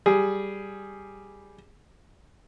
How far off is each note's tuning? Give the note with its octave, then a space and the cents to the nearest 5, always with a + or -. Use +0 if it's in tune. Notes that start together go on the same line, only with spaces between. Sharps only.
G3 +0 G#4 +0